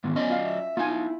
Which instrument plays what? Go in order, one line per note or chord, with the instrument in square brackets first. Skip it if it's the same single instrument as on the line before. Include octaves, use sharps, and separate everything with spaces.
[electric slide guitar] G#2 D#3 E3 [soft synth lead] B3
[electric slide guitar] F#3 D5 D#5 [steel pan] C#4
[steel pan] F4 F5
[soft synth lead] E5
[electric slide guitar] B3 D#4 [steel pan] F4 G#5
[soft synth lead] E4